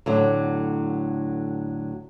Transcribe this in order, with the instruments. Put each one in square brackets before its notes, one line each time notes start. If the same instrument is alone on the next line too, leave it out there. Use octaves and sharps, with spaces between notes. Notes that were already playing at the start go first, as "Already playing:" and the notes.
[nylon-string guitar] A2 D3 F#3